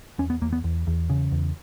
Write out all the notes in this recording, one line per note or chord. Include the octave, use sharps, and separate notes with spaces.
E2 C#4
B3
E2 A#3
B3
E2
E2
C#3
E2